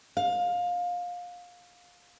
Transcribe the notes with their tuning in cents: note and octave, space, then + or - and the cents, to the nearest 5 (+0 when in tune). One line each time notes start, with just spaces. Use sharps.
F5 +25